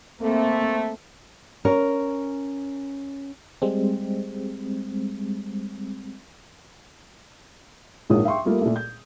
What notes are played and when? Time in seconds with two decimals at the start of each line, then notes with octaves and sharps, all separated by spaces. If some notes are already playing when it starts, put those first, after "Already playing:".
0.21 A3 A#3 C4
1.65 C#4 A#4
3.62 G3 G#3 C4
8.10 A#1 G#2 F3 A#3 C#5 D#6
8.25 E5 F5 G5 C6 C#6
8.45 G3 A3 A#3 F4
8.61 A#2 A3
8.76 G6